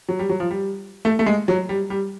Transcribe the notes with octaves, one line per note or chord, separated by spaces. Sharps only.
F#3
G3
F#3
F3
G3
A3
A3
G#3
F#3
G3
G3